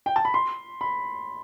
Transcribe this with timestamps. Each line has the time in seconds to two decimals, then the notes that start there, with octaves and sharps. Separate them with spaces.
0.06 G5
0.16 A5
0.25 B5
0.34 C6
0.81 B5